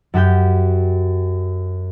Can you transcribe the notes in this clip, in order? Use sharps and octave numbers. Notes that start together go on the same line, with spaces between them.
F#2 F#4 G4 G6